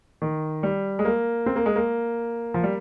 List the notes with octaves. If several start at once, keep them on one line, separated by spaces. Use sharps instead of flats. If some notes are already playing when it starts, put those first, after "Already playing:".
D#3
G3
G#3
A#3
C4
A#3
G#3
A#3
F3
G3